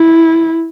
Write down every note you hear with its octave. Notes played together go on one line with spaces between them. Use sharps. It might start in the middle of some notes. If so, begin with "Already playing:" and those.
Already playing: E4